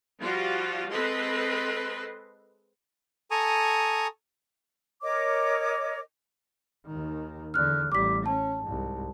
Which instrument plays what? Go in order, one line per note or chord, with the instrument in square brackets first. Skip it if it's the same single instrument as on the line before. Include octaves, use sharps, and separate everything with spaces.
[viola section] F3 G3 F4 F#4
G#3 C4 A4 B4 D#5 C6
[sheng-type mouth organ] A4 G#5 A#5 C#6 D#6
[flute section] A#4 C#5 D#5 D6
[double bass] D#2 D#3
[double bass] E2 D3 [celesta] F6 F#6
[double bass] A1 G3 [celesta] D6 B6
[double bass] C#4 [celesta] A5
[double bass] C2 G#2